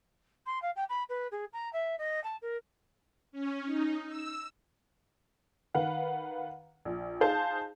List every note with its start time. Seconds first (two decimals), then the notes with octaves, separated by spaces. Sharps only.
0.46 C6
0.62 F5
0.76 G5
0.89 B5
1.09 B4
1.31 G#4
1.53 A#5
1.73 E5
1.98 D#5
2.23 A5
2.42 A#4
3.32 C#4
3.65 D#4
4.08 E6
5.74 D#3 B4 F5 F#5
6.85 A#1
7.21 D#4 G#4 C5 F5 A5